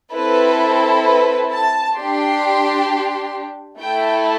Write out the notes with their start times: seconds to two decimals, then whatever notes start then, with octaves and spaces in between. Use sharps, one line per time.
0.13 C4 E4 A4 B4
1.04 B4
1.51 A5
1.97 D4 G4 C6
3.81 A3 E4 A4 G5